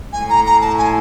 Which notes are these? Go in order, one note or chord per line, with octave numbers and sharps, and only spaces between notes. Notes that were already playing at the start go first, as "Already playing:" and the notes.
A2 G#5
A#5
A#5
A5
G#5